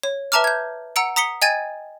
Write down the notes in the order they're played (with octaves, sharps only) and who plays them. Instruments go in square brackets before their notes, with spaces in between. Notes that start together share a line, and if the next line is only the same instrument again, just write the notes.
[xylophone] C#5
B4 E5 A5 A#5 D6 F6
G6 G#6
F#5 A#5 E6 C#7 D7
A#5 D#6 B6 C#7 G7
D#5 G5 G#5 G#6 A6 D#7